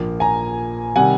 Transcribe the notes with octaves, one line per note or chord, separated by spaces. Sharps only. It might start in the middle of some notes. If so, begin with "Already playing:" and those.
Already playing: A#1 A#2 F3 A#3
G#5 A#5
C3 D#3 G3 F#5 G#5